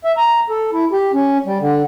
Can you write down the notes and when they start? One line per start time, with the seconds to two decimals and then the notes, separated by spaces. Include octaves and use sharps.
0.04 E5
0.17 A#5
0.49 A4
0.73 E4
0.92 G4
1.13 C#4
1.46 G3
1.60 D3